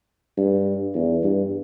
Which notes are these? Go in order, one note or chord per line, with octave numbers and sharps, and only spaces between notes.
G2
E2
G2